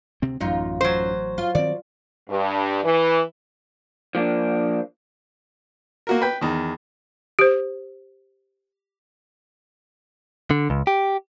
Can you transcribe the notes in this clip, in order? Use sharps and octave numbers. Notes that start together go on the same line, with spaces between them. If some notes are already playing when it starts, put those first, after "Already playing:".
D2 C3 C4
A1 F#2 D#4 F4
F#3 C5
F4
D#3 C4 D5
G2
E3
F3 A#3 D4
A#3 F#4 A#4
B4 G5
E2 D#3
G4 C5
D3
C#2
G4